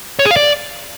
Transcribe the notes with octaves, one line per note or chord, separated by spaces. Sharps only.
C#5
G#4
F5
D5